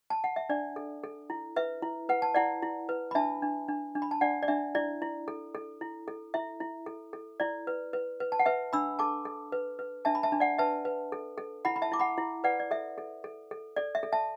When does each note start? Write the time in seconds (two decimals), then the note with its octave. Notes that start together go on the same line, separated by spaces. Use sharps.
0.10 A5
0.24 F#5
0.36 E5
0.49 D4 D5
0.76 A4
1.04 A4
1.30 E4
1.56 B4 E5
1.82 E4
2.09 B4 F#5
2.22 A5
2.34 E4 D5 F#5
2.62 E4
2.89 B4
3.11 B5
3.15 D4 E5 A5
3.42 D4
3.68 D4
3.95 D4
4.02 B5
4.11 A5
4.21 D4 D5 F#5
4.43 D5
4.48 D4 E5
4.75 E4 D5
5.02 E4
5.28 A4
5.55 A4
5.81 E4
6.08 A4
6.34 E4 E5
6.60 E4
6.86 A4
7.13 A4
7.40 E4 D5
7.67 B4
7.93 B4
8.20 B4
8.32 A5
8.39 F#5
8.46 B4 E5
8.73 D4 B5 E6
8.99 A4 A5 D6
9.25 A4
9.52 B4
9.79 B4
10.05 D4 E5 A5
10.15 B5
10.23 E5 A5
10.32 D4
10.40 D5 F#5
10.58 B4 E5 A5
10.85 B4
11.12 A4
11.38 A4
11.65 E4 F#5 B5
11.76 B5
11.82 E5 A5
11.92 E4 D6
12.00 F#5 B5
12.18 E4
12.44 B4 D5 F#5
12.60 D5
12.71 A4 E5
12.98 A4
13.24 A4
13.51 A4
13.76 A4 D5
13.95 E5
14.03 A4
14.12 E5 A5